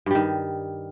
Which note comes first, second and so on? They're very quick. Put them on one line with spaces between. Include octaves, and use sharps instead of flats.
G2 G3 D#3